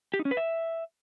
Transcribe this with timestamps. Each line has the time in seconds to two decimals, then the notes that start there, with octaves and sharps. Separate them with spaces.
0.14 G4
0.19 D#4
0.25 C#4
0.31 B4
0.37 E5